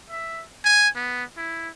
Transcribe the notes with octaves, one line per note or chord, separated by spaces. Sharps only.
E5
G#5
B3
E4